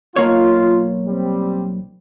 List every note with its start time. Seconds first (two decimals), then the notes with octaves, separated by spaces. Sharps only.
0.16 B1 A#3 F4 C#5
1.07 G3 C4